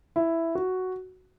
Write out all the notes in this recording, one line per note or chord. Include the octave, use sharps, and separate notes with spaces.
E4
F#4